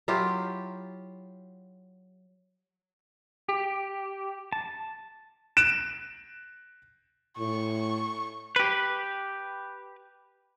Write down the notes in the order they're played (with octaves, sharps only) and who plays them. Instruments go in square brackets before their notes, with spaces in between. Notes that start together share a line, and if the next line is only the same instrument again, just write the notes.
[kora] F#3 E4 F4 G4
[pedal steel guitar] G4
A5
[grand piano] F#6 D7 E7
[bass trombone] A2 [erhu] C#6
[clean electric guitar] G4 B4